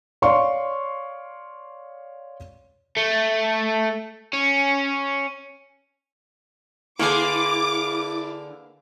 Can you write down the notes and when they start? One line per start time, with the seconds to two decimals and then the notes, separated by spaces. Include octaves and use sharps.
0.22 C#5 D5 F5 C6 C#6
2.97 A3
4.33 C#4
6.99 D3 A#3 E4 G#4 B4 C6 D6